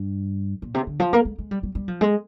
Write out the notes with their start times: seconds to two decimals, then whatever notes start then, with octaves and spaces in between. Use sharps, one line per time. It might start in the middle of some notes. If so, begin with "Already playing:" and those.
Already playing: G2
0.62 A#2
0.74 C3
0.87 D3
1.00 F3
1.13 A#3
1.25 G#3
1.38 G#3
1.51 G3
1.63 G3
1.75 G3
1.88 F3
2.01 G#3